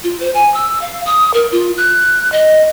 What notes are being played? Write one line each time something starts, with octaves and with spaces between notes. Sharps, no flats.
F4
C5
G#5
E6
F5
D#6
A#4
F4
F#6
D#5